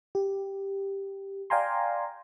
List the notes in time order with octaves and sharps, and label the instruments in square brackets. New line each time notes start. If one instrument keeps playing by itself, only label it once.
[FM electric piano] G4
D5 F5 G5 G#5 A#5 C6